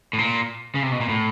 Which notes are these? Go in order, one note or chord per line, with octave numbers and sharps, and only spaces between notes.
A2
A#2
C#3
C3
B2
A#2
A2